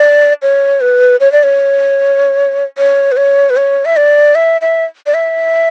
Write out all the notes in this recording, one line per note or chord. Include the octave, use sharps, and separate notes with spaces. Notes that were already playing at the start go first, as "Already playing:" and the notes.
Already playing: D5
C#5
B4
C#5
D5
C#5
C#5
B4
C#5
B4
C#5
E5
D5
E5
E5
D5
E5